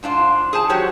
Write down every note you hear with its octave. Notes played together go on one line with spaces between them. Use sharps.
G#2 D4 F4 C5
G#4 C5 A5
F#3 F#4 G4 C5 C#5